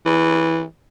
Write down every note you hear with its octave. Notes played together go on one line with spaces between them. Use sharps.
E3